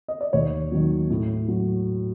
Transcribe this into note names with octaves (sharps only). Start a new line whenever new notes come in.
D#5
D5
D#2 C#5
D#3 F#3
A2
F#3